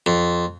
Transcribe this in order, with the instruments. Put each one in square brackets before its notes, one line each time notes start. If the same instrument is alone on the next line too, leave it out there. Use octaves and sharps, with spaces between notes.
[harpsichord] F2